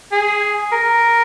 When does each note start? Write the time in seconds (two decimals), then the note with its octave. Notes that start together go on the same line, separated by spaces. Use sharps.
0.12 G#4
0.72 A#4